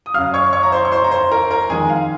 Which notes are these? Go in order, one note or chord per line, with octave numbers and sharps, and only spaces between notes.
D#6
F#2 C#3 F#3 F5 F6
C#5 C#6
C#5 C#6
A#5
C5 C6
C#6
C5 C6
A#5
C5 C6
A#4 A#5
A#4 A#5
F2 D#3 G#3 G#4 G#5
F5